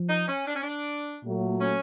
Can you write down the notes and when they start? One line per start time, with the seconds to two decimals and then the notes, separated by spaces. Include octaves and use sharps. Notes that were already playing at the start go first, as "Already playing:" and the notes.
Already playing: F3
0.09 D#4
0.28 C#4
0.47 D4
0.55 C#4
0.63 D4
1.23 A#2 F#3 A3
1.60 C#4